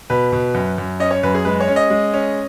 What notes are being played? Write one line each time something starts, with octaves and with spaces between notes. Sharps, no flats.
B2 B4
B2
F#2
F#2
C#4 D#5
C#5
F#2 B4
G#4
G#3 B4
C#5
C#4
D#5
G#3
C#4